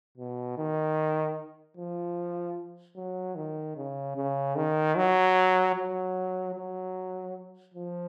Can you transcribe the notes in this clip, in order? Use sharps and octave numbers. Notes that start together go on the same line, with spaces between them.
B2
D#3
F3
F#3
D#3
C#3
C#3
D#3
F#3
F#3
F#3
F3